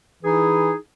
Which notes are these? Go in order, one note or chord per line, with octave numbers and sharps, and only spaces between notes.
E3 D#4 E4 G#4